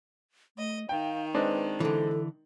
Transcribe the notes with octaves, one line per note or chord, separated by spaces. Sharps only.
A3 D#5
D#3 F5 G5
G#3 C4 D4 B4
D3 E3 A4